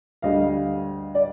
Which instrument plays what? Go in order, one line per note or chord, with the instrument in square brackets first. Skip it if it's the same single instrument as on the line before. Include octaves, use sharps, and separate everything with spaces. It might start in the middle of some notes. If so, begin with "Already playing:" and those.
[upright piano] D2 D3 G3 D#5 F5
D5